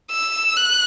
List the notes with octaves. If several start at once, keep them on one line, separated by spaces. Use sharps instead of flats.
E6
F#6